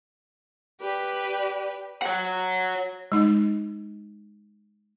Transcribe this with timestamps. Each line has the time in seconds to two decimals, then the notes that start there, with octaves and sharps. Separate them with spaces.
0.81 G4 B4 D5
2.02 C#5 F#5
3.12 G#3 D#4